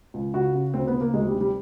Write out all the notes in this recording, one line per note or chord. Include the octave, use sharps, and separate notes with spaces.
C#2
C#3 F#4
C#3
D2 C4
B3
C#3
A#3
D2 G#3
G3
C3
G3